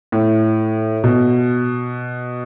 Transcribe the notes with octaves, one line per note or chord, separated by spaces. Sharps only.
A2
B2